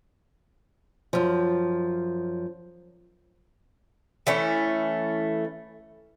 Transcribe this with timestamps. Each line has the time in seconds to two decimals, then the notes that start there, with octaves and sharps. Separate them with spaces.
1.13 F#2 F3
4.27 E3 A3 C#4